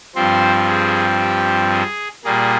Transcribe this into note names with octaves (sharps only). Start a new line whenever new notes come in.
G2 F3 C4 C5
G#4
G4
G#4
A#2 G3 A#3 G#4